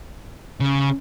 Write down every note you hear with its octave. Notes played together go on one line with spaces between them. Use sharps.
C#3